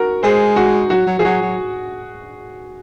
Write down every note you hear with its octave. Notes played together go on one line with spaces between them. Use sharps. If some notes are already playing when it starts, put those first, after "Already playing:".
Already playing: F#4 A#4
G#3 G#4 C5
F#4
F#3 F#4
F#3
F3 G#4
F#3 F#4
F#3